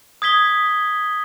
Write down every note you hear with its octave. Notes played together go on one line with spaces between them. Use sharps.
D#6 G#6 B6 G7